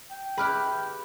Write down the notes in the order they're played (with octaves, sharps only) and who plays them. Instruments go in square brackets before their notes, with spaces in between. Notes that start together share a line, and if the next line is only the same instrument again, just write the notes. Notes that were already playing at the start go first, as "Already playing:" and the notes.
[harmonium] G5
[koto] E4 G4 B4 [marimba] G#4 F6 F#6 [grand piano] B5